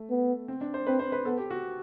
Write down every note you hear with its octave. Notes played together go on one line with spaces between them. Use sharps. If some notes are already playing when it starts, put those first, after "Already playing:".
Already playing: A3
B3
C4
D4
C5
C4 B4
C5
B4
B3 A4
G4
F#4